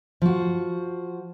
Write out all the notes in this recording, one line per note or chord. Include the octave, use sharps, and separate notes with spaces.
F3 F#4